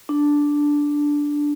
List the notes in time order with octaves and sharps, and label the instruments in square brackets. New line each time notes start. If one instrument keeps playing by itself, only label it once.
[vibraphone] D4